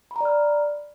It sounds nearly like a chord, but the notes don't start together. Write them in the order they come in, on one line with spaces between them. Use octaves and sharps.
B5 A#5 D5 F6